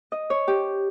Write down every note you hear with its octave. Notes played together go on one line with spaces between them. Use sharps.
D#5
C#5
G4